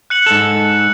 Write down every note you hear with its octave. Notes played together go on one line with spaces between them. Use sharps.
F#6 C#7 F#7
G#2 A4